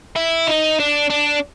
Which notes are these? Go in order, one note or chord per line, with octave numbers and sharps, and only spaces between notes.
E4
D#4
D4
D4